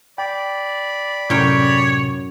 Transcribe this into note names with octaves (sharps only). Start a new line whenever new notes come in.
D5 G5 B5
F#2 A2 C3 C#5 G5